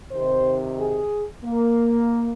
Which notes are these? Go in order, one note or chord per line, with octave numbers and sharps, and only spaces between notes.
C3 D#3 C5
G#4
A#3